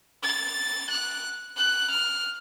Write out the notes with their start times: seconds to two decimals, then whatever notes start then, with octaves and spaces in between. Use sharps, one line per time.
0.23 A6
0.90 F#6
1.56 F#6
1.90 F6